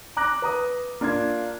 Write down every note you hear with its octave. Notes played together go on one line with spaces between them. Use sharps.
A#5 D6 F#6 A#6
B4 A#5 D#6
A#3 D4 F4 G#6